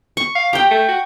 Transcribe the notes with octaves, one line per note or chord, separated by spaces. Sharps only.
C#6
F5
G4 G5 A#5
A3
F#4